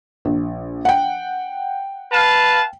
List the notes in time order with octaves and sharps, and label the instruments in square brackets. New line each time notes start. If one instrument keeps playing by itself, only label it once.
[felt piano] A#1
F#5 G5
[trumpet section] B4 F5 A5